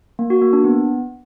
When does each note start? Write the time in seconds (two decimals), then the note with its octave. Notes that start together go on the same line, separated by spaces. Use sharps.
0.19 A#3
0.30 F#4
0.42 A#3
0.53 D4
0.64 B3